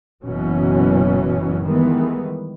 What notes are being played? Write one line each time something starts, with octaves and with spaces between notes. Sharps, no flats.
F#1 F#2 B2 E3 F#3 C#4
D#3 E3 G3 G#3 B3